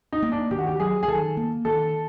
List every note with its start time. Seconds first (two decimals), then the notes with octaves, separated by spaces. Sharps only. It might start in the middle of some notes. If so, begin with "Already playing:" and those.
0.13 D#4
0.22 A#3
0.32 D4
0.51 D#3 G4
0.59 F#4
0.67 G4
0.80 F#3 G#4
1.03 G#4
1.08 D#3 A4
1.37 A#3
1.65 D#3 A4